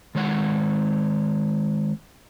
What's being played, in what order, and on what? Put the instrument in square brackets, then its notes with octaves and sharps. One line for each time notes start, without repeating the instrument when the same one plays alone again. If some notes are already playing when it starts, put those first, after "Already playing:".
[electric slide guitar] D#3 G#3 C#5 F#5